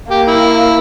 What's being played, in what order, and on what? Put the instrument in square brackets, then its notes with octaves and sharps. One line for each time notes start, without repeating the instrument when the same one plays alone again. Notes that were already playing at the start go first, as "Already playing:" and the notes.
[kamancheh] A#3 [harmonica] G4
[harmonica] E4